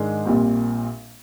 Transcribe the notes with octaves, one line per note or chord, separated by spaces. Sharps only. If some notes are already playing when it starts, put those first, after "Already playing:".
Already playing: G#2 D#3 G#3 D4
A#1 A#2 G3 C4